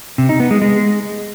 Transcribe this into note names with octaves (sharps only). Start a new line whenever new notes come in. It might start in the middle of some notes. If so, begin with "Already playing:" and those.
C3
D#4
B3
G#3
G#3